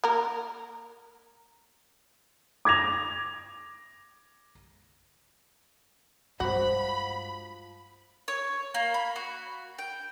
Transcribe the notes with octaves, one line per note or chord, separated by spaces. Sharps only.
A#3 A#4
D6 G#6 A#6 F7
G2 F3 G#3 F#4 B5
C#5
A#3
B5
F#4
G5